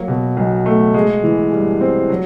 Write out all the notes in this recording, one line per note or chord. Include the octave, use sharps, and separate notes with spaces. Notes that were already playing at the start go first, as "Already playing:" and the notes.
Already playing: F#3 A#3
B2
B1
A3
G#3
E3
G2
C4
F#3